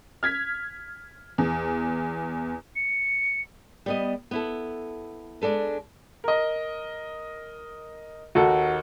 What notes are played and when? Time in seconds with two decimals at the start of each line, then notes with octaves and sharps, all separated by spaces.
0.23 F6 G#6 B6
1.38 E2
2.76 C#7
3.86 G3 B3 D#5
4.31 B3 E4 A4
5.42 G#3 D4 A4 B4
6.24 A#4 D#5
8.35 D#2 D#4 F#4 A4